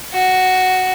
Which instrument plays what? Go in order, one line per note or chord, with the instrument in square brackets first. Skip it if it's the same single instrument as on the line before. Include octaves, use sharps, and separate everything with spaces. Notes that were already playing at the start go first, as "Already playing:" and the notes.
[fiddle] F#4